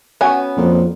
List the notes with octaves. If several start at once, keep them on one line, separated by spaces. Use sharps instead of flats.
B3 C#4 F#4 G#5
F2 A#2